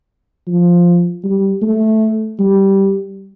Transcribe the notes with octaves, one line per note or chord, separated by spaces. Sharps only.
F3
G3
A3
G3